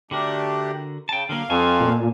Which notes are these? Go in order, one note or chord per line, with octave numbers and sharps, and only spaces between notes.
D3 A3 D4 F#4 G4 A#4
C#3 G5 A5
D3 F#3 A#3 F5
F2 G#5 A5 C#6
A#2